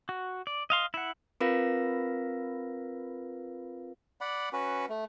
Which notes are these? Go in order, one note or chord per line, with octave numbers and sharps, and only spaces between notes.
F#4
D5
D#5 F5 C6
E4 F#5
C4 F4 A#4 B4 F5 A#6
D5 F#5 B5
C#4 F#4 B4
A3